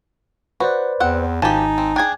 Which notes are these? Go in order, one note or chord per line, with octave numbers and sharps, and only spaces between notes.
F#4 B4 C5 D5
E2 C4 F#5
G#1 F3 D#4 G4 G#5 A5
C4
D4 G#4 G5 G#6